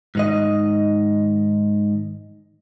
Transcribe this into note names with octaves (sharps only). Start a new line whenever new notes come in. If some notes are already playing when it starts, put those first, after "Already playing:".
G#2 D#3 D#5